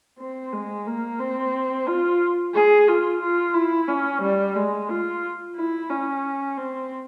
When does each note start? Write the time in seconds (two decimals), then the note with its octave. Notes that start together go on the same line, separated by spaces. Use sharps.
0.19 C4
0.53 G#3
0.87 A#3
1.20 C4
1.87 F4
2.54 G#4
2.88 F4
3.21 F4
3.54 E4
3.88 C#4
4.22 G3
4.55 G#3
4.89 F4
5.56 E4
5.90 C#4
6.57 C4